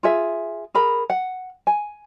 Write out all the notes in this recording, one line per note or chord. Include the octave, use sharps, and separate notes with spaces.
F4 G#4 E5
G#4 A#4 B5
F#5
G#5